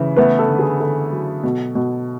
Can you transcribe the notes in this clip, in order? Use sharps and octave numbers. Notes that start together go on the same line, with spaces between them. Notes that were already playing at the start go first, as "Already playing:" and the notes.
Already playing: C#3 E3
A3 B3 B4
A4
D3
G#4
D3 A4
F#3
B2
B2